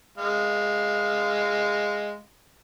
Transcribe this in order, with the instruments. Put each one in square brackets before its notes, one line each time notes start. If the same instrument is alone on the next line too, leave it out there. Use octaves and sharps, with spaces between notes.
[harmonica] G#3 F5